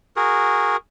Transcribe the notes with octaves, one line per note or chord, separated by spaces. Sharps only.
F#4 G#4 A#4